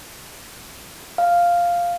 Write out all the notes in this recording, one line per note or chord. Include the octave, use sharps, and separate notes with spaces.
F5